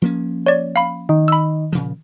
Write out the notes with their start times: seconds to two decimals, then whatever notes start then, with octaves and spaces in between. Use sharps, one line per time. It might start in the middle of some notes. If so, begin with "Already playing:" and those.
0.02 F3 A#3 C#4
0.46 C#5 D5
0.76 F5 B5
1.09 D#3
1.28 B5 E6
1.73 A#2 C#3 F3